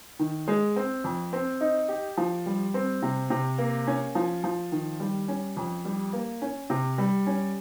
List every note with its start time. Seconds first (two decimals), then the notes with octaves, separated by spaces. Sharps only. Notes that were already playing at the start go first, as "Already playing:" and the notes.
0.19 D#3
0.48 G#3
0.76 C4
1.04 F2
1.33 C4
1.61 D#4
1.89 G4
2.17 F3
2.46 G3
2.74 C4
3.02 C3
3.30 C3
3.58 A#3
3.87 C#4
4.15 F3
4.44 F3
4.72 D#3
5.00 G3
5.28 C#4
5.57 F2
5.85 G3
6.13 A#3
6.42 C#4
6.70 C3
6.98 G3
7.27 C#4